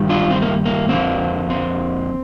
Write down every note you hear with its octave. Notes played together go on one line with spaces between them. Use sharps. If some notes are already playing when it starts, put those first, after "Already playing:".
Already playing: G2 D#3 G3
D4 F4
C4
A#3
A#3
F2 D3 G3 A#3 C4
C4